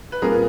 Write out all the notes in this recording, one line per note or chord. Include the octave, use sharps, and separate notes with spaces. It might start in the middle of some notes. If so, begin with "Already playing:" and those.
B4
A#2 G3 C4 G#4 A#4